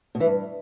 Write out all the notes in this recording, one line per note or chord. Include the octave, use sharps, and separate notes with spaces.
B2
E3
G2